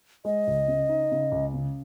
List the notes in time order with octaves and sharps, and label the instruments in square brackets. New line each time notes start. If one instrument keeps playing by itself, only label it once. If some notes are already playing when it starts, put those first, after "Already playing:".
[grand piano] G#3 [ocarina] D#5
[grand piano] C#2
C#3
D#4
C#3
C#2
C#3